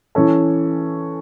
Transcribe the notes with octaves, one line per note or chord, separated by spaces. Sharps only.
E3 C#4 A4